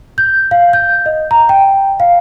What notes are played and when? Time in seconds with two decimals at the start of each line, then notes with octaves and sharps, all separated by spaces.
0.18 G6
0.51 F5
0.73 G6
1.06 D#5
1.31 A#5
1.49 G5
2.00 F5